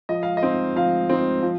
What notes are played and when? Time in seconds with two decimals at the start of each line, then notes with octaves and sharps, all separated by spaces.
0.09 F3 D#5
0.23 F5
0.37 D#5
0.43 C4 D#4
0.76 F3 F5
1.10 C4 D#4
1.43 F3